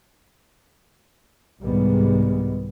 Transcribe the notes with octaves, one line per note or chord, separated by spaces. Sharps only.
C2 G#2 D#3 G3 G#3 B3